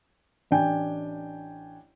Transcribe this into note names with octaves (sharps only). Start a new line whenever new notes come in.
A1 D4 G5 G#5